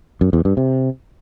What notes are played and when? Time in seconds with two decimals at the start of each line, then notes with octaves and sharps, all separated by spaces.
0.21 F#2
0.33 E2
0.45 G2
0.57 C3